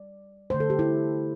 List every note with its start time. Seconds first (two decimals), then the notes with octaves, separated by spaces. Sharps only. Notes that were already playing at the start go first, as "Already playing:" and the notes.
Already playing: G3 D5
0.50 D3 A3 C5
0.60 A4
0.70 G4
0.79 E4